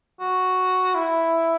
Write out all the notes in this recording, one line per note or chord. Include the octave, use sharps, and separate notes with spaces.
F#4
E4